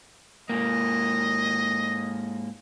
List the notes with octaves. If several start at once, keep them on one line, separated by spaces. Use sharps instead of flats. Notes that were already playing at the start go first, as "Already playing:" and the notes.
G#2 A#3 D#5